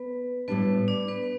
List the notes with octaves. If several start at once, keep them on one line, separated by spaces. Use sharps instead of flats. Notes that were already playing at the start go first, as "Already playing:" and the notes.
Already playing: B3 B4
A2 G3 B3 D4 B4
D4 D5
B3 B4